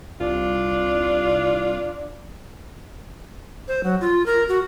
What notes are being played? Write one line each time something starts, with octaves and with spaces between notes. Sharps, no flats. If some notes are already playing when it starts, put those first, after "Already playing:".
C2 D4 F4
C5
F#3
F4
A#4
F#4